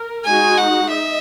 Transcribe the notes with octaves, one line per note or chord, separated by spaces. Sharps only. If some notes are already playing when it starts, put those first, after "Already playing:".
Already playing: A#4
G#3 D#4 F#4 G#5
F#5
D#5 E5